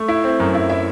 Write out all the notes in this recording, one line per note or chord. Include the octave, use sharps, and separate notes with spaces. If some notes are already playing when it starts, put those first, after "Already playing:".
Already playing: A3
E4
C4
F#2
E4
E4 E5